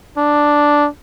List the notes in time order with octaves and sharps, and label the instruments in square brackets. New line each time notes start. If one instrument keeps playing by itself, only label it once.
[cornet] D4